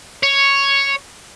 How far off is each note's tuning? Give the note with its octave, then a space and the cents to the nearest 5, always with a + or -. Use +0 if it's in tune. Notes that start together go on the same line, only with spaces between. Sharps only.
C#5 +0